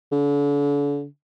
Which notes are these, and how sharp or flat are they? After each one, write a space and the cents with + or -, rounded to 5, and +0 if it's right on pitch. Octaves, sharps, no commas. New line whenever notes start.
D3 -40